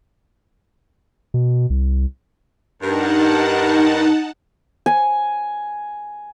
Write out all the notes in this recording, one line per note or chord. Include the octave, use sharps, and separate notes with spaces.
B2
C2
G2 D#4 A#4 F#5 A5
G#5